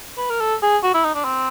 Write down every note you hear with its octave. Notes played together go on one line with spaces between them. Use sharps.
B4
A#4
A4
G#4
F#4
E4
D#4
D4
C4